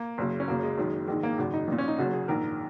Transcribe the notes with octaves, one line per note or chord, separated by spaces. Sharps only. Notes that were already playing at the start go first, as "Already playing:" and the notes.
Already playing: A#3
F#1 F#2 C#3
C#4
F#1 F#2 C#3 A#3
G#3
F#1 F#2 D#3
A#1 G#2 D#3 G#3
A#3
G#1 F#2 C#3
D#4
A#1 A#2
C#4
D#4
F#1 F#2 C#3 F#4
G#4
A#1 G#2 D#3 A#4